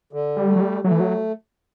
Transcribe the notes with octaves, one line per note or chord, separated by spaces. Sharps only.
D3
G3
A3
F#3
G3
F#3 A3
E3
F#3